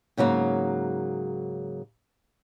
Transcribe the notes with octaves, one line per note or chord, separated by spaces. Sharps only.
G#2 C#3 F#3 A#3